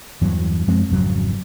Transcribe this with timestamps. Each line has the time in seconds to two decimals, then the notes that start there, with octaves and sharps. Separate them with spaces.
0.21 E2 G2 E3 F#3
0.68 F#2 F3 G#3 C4
0.89 G#1 F2 C#3 F#3